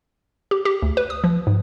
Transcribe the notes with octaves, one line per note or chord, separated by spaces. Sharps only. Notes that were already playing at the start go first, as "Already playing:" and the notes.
G4
G4
D2
B4
D#6
F3
G#2